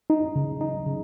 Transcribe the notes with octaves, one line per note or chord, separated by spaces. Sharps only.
D#4
C#3
D#4
C#3